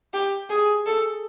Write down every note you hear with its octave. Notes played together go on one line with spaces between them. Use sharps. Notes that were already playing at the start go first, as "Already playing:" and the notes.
G4
G#4
A4